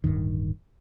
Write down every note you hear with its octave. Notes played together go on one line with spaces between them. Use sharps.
D1 B1 G2 D#3